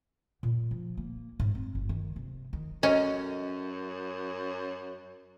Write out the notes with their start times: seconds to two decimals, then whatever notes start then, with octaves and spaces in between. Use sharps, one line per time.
0.43 A#2
0.71 F3
0.97 A#3
1.40 G#2
1.55 C4
1.75 G1
1.89 D#3
2.16 C3
2.53 D#3
2.83 F#2 C#4 A4 D#5 A#5